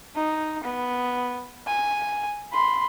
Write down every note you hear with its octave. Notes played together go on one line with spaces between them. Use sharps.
D#4
B3
G#5
B5 C6